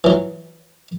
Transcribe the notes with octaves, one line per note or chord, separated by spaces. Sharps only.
E3 F#3